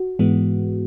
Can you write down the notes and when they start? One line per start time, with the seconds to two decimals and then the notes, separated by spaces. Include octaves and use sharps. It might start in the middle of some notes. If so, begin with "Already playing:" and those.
Already playing: F#4
0.19 G#2 E3 G#3 B3